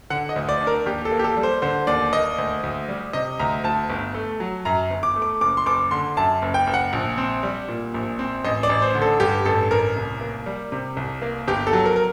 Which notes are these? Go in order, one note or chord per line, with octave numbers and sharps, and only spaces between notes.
D3 F#5
D#5
D2
D5
D4
A#4
D#2 G4
A4
A#3
G4
A4
G3
C5
D3 C5
D#2 D5
A#3 D#5
D2
D2
G3
C3 D#5
D2 A#5
D2 A5
G1
A3
F#3
F#2 A#5
G1
D6
A3
D6
F#1 D6
C6
F#1 D6
D3 C6
F#2 A5
F#1
G5
F#1
F#5
A#1
C4
G3
A#2
A#1
C4
A1 D#5
D5
A1
C5
D3
A4
G2 G4
A1 A4
A1 A#4
C2
A#3
G3
C3
C2
A#3
G1 G4
A4
F#3
A#4
A#4